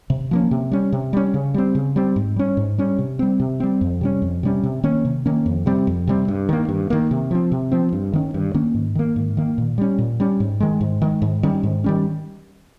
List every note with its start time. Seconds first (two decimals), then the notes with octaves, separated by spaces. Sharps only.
0.10 C3
0.31 F3 A#3 C#4
0.51 C3
0.71 G3 C#4
0.92 C3
1.13 G3 C#4
1.34 C#3
1.54 G3 C4
1.75 C#3
1.96 G3 C4
2.16 G#2
2.36 G3 C#4
2.57 G#2
2.78 G3 C#4
2.98 C3
3.19 G3 C4
3.40 C3
3.60 G3 C4
3.81 F2
4.01 C3 G3 C#4
4.22 F2
4.43 C3 G3 C#4
4.63 C3
4.84 D#3 A#3 C#4
5.05 C3
5.26 D#3 A#3 C#4
5.46 F2
5.66 C3 G3 C4
5.87 F2
6.07 C3 G3 C4
6.28 G2
6.49 D#3 A#3
6.69 G2
6.90 D#3 A#3
7.11 C3
7.31 F3 C4
7.52 C3
7.72 F3 C4
7.93 G2
8.13 D#3 A#3 C#4
8.34 G2
8.54 D#3 A#3 C#4
8.74 G#2
8.95 D#3 A#3
9.16 G#2
9.37 D#3 A#3
9.58 A#2
9.78 G3 C#4
9.98 A#2
10.20 G3 C#4
10.40 G#2
10.60 D#3 G#3
10.81 G#2
11.02 D#3 G#3
11.22 G#2
11.43 D#3 G3 C#4
11.63 G#2
11.84 D#3 G3 C#4